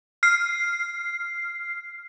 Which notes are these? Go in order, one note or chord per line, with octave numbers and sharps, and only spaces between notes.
F6 C7